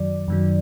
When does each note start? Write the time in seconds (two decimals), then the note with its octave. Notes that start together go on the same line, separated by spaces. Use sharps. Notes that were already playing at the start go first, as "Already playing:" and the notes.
Already playing: F#2 D#3 F#3 D5
0.28 F#2 D#3 F#3